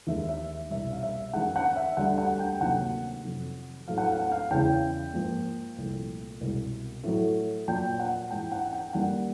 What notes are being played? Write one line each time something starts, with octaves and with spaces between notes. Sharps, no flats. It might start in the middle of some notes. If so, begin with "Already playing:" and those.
D#2 D#3 G#3 E5
E5
C2 B2 G3 E5
F5
E5
F#2 D#3 G#3 F#5
F#5
E5
D2 D3 G3 F#5
F#5
G5
D2 C3 D#3 F#3 A#3 F#5
F2 C3 D#3 F#3
A2 F#3 A3 F5
F#5
F5
F#5
F5
E2 C#3 E3 G#3 G5
G#2 F3 A#3
C2 A#2 F3 A3
C2 B2 G#3
A2 F#3 A3
A#2 F#3 A#3 G5
F#5
G#2 E3 G#3 G5
F#5
F#5
G5
F#2 D#3 G3 A#3 F#5